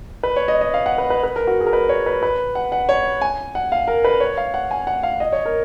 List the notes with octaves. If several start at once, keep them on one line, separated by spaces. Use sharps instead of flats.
B4
C#5
D#5
D#5
F5
F#5
B4
B4
B4
A#4
F#4
G#4
A#4
B4
C#5
B4
B4
F#5
F#5
C#5
G#5
F#5
F5
A#4
B4
C#5
F5
F#5
G#5
F#5
F5
D#5
C#5
A#4